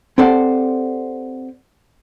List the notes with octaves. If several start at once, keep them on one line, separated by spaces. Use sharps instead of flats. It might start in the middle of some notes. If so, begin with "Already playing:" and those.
C4 G4 A4 C5 D5 F#5